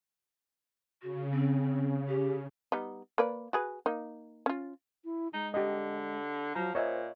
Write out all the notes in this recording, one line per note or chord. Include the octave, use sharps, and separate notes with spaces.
C#3 F#4
C4
G4
G3 B3 D#4
A#3 B4 D5
F#4 G#4 B4
A#3 D#4
C#4 F4
E4
G#3 D#4
D3 G4 D#5
F3 F#3 A#5
A#2 C5 C#5 D#5 E5